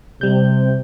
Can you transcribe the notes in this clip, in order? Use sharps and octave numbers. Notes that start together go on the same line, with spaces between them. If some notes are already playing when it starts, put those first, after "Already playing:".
C3 G3 G6